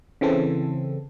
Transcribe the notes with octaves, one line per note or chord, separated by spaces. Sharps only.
C#3 E3 C4 A4